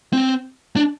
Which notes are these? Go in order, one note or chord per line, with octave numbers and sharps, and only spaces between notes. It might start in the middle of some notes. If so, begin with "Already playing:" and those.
C4
D4